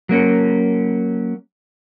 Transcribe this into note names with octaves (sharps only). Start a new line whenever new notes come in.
F#3 A#3 C#4